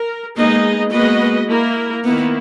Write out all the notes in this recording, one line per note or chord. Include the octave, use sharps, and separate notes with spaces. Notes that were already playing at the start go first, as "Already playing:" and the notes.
Already playing: A#4
G#3 A#3 B3 D#4 G#4 D#5
G#3 A#3 B3 F#4 B4 D#5
A#3 E4 A#4
D#3 A#3 B3 E4